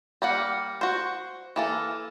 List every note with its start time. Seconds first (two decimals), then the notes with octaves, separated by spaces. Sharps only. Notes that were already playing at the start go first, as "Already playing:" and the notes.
0.22 G3 A#3 F#5
0.81 F#4 C5
1.56 E3 A#3 A4